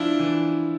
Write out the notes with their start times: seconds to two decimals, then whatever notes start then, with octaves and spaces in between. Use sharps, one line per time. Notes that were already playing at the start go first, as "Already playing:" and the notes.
Already playing: F3 D4 E4
0.19 E3